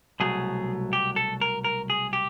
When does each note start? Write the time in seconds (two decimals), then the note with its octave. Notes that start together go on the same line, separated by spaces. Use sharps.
0.20 C2 B2 F#3 A3 G#4
0.93 G4
1.16 A4
1.41 A#4
1.64 A#4
1.90 G#4
2.13 G4